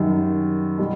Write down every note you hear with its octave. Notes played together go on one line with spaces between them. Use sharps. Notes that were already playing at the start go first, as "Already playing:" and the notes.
Already playing: F#2 D#3 G3
B2 G3